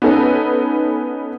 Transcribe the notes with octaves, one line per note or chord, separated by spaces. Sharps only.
B3 C#4 D#4 A4 B4